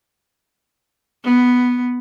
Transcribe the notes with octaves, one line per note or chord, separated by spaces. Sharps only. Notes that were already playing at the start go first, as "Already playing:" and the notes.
B3